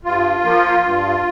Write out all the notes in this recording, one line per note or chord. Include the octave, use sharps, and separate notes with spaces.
G2 F4
F3 A#3
G2